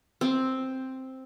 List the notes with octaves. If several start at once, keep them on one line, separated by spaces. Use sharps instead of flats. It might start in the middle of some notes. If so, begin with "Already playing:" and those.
C4